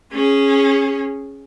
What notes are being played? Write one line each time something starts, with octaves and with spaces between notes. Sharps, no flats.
C#4 G#4